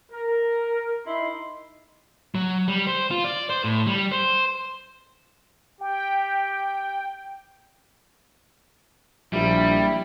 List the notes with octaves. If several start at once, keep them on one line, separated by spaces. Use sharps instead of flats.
A#4
D#4 E4 C6
F#3
G3
C5
F4
D5
C5
A2
G3
C5
G4 G5
A#1 G3 E4